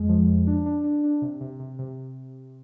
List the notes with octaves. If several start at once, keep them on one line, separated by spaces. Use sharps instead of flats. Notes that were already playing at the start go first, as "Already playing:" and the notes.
Already playing: F2 G#3
F3
F2
D4
D4
D4
D4
C3
C3
C3
C3